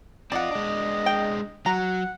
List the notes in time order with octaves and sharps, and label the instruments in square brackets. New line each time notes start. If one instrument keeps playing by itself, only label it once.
[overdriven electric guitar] C4 F4 [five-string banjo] D5 F#5 [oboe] D#5
[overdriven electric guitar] G#3 D4
[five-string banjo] G5
[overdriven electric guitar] F#3 [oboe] F#5 [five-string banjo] A#5